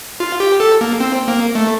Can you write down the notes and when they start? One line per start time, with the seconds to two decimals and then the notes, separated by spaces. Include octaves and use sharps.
0.20 F4
0.40 G4
0.60 A4
0.81 A#3
1.00 C4
1.28 A#3
1.55 A3